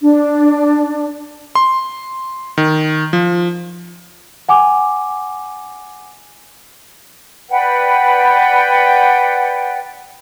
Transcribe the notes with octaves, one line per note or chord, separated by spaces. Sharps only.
D4
C6
D#3
F3
F#5 G#5 D6
B4 D5 F#5 G5